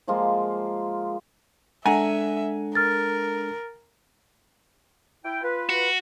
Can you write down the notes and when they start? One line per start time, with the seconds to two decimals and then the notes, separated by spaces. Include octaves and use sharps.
0.08 F3 G#3 A#3 F4
1.85 G#3 D4 A4 E5 F#5 G#5 A#5
2.75 A#4 F6 A6
5.24 E4 G5
5.42 F4 B4
5.69 F#4